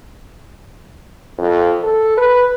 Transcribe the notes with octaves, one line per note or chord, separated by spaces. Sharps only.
F2
A4
B4